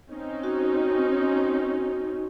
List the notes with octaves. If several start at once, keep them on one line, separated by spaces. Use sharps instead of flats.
C4 C#4 D#4
F#4